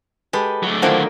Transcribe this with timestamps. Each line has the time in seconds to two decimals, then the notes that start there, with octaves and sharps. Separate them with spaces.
0.33 G#3 G4 A4 B4
0.63 F#3 A3
0.82 D3 D#3 F3 A#3 D4 E4 F#5